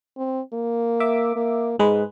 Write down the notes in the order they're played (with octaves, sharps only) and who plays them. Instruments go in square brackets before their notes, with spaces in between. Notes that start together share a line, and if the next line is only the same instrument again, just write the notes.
[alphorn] C4
A#3
[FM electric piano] E5 D6
[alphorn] A#3
[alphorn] G#2 [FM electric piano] G#3 B4